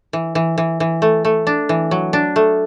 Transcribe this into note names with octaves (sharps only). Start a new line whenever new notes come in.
E3
E3
E3
E3
A3
A3
D4
E3
F#3
D4
A3